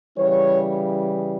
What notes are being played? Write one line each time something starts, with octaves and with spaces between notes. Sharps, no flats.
C#3 E3 G3 C#5